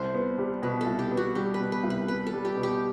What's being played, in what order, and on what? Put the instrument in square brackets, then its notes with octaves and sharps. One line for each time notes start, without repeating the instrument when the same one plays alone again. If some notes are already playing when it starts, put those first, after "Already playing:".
Already playing: [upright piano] C2 [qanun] C5
[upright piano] B3
G3
[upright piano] B2 [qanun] B4
[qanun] A4
[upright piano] C2
[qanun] G4
[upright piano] B3
[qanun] F#4
[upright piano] G3 [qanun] G4
[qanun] B4
[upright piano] B2
[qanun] B4
[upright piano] C2
[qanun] B4
[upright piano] B3 [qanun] B4
[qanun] A4
[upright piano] G3
[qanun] G4
[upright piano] B2
[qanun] G4